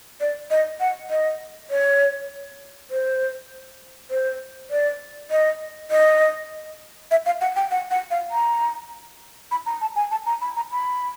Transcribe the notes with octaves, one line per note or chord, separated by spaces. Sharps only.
D5
D#5
F#5
D#5
C#5
C5
C5
D5
D#5
D#5
E5
F5
F#5
G5
F#5
F#5
F5
A#5
B5
A#5
A5
G#5
A5
A#5
B5
A#5
B5